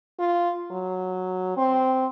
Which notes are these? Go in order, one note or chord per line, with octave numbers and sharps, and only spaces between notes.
F4
F#3
C4